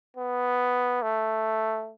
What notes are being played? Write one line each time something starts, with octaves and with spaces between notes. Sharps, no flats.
B3
A3